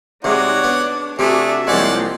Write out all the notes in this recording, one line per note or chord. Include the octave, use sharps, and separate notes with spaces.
C3 G#3 D#4 F#4 C#5 D5 F#5
B3 D4
C3 A3 D4 F#4 G#4 D5 E5
C2 F3 G#3 A#3 C4 C#5 D5 F#5